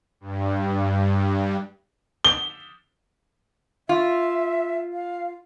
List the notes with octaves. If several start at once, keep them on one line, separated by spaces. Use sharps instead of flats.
G2
G7
F4 E5
F5